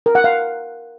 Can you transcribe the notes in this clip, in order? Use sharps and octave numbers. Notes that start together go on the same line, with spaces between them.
A#4
F#5
F5